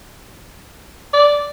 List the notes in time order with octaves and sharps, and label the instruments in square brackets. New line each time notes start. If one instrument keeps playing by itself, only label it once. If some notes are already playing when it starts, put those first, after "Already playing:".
[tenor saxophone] D5